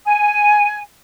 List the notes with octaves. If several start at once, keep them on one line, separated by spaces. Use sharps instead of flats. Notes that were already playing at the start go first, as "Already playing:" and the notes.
G#5